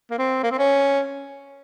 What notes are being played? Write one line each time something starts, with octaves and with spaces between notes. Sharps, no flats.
A#3
C4
A#3
C4
C#4